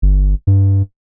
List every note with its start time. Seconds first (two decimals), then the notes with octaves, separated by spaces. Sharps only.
0.02 G1
0.47 G2